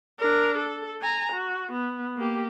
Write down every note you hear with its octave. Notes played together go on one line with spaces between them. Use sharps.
D4 A#4
A4
G#5 A#5
F#4
B3
A#3 G4